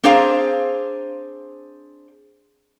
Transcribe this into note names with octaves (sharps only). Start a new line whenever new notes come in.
C4 D4 G#4 C5 F5 A#5